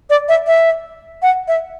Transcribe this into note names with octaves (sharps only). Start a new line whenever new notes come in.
D5
E5
E5
F#5
E5